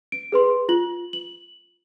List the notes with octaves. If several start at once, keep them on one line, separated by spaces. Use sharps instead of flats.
D7
G#4 B4 C6
F4 F#7
F#7